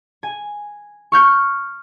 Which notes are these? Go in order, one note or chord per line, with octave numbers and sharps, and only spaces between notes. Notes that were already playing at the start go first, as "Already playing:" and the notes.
G#5
C#6 F6 G6 C#7